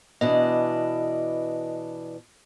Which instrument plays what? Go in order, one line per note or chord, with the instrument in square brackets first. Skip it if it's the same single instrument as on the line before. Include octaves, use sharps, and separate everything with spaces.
[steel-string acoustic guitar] B2 E3 D4 [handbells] D#5